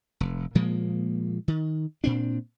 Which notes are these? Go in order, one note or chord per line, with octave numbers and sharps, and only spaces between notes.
F1
A#2 F3 G#3 A#3
D#3
A#2 C4 D4